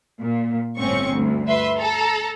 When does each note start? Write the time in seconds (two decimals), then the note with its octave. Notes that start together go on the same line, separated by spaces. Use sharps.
0.21 A#2
0.77 G1 A2 C4 C#4 C#6
1.11 D2 G2
1.47 B4 E5 C6
1.78 A4 A#5